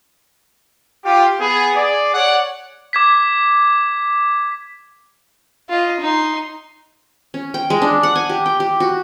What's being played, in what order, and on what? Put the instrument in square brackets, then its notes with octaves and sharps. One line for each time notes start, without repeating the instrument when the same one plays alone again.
[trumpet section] F4 G4
B3 G#4
G#4 D5
C#5 D5 F#5
[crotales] D6 G#6 B6
[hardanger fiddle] F4 D#5
D#4 C6
[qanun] C#4
G5
G#3
D4
F#5
G#5
G4
G5
G4
F#4